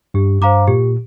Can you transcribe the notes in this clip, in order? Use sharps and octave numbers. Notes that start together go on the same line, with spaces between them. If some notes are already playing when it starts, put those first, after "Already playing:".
G2 G4
G2 C5 F5 A#5 D6
A#2 G4